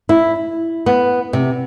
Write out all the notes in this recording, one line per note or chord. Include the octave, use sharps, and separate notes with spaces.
E4
B3
C3